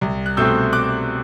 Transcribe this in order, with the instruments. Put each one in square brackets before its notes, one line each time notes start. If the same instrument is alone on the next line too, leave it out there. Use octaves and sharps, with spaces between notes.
[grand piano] C2
F#6
B2 A3 C4 E6 G6
D6 F#6